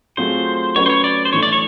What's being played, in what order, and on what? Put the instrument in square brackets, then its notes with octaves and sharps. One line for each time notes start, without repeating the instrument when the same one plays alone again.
[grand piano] F#3 A3 C4 F4 G#4 [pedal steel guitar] C5
[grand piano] F#3 A3 C#4 F#4 B4 [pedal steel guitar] C#5
[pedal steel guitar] C5
C#5
D5
C5
[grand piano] E3 A3 D4 [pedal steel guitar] C#5
[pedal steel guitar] D5
C#5